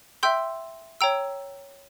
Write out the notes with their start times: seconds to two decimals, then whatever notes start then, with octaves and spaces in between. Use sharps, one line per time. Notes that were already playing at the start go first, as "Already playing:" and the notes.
0.23 E5 G5 C6 E6 G6
1.01 C#5 G5 A#5 E6